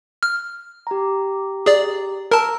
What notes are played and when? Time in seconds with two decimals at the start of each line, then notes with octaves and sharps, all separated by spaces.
0.23 F6
0.87 G4 A#5
1.66 G#4 D5
2.31 A#4 A5 A#5 E6